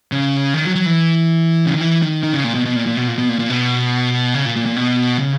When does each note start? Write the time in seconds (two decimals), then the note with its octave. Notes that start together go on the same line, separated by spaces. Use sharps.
0.12 C#3
0.54 D#3
0.65 F#3
0.75 F#3
0.86 E3
1.66 C#3
1.73 D#3
1.80 E3
2.02 D#3
2.23 D#3
2.33 C#3
2.44 A#2
2.55 B2
2.65 B2
2.76 A#2
2.87 A#2
2.97 B2
3.08 A#2
3.18 B2
3.29 A#2
3.39 A#2
3.50 B2
4.34 C#3
4.45 A#2
4.56 A#2
4.66 A#2
4.77 B2
5.19 C#3